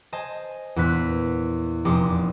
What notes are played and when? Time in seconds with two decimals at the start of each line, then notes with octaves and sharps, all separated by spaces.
0.13 C5 D#5 G#5 A5
0.76 E2 A#2 B3 F#6 B6
1.85 F1 A#3 D5 C6 D6 D#6